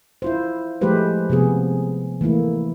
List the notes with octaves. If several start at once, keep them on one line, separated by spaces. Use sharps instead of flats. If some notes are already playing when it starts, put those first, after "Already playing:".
E4 F4 C5
F3 G#3 A3 G4 B4 C5
C3 F3 B3 G#4
E3 A3 A#3 E4